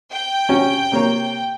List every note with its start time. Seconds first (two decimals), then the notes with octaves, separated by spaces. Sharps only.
0.12 G5
0.49 C3 C#4 F#4
0.92 C3 A#3 C#5